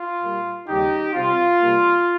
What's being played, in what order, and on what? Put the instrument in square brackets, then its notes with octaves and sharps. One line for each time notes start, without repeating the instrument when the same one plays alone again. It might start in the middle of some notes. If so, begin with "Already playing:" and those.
Already playing: [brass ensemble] F4
A#2 G3 A#3
D#2 C#3 G3 D#4 G4
C3 G3 C4 F4
C3 G3 A#3